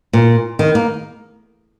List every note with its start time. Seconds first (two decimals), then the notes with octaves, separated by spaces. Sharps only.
0.13 A#2
0.59 D#3
0.75 A#3